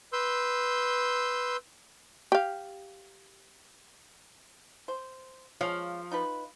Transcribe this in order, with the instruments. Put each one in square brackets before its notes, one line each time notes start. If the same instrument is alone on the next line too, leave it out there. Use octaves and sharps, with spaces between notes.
[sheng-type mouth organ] B4 C6 E6 G6
[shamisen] G4 F5
[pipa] C5
[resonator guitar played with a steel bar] F3 [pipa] G#3 C#5 F5
[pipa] D#4 F4 B4